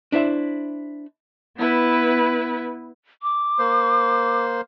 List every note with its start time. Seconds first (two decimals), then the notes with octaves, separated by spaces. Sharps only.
0.12 D4 E4 C5 E5
1.56 B3 E4 B4
3.22 D6
3.59 A#3 C5